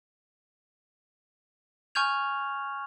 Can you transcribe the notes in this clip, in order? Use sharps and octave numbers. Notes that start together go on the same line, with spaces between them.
G#5 C#6 F6 G6 G#6 F7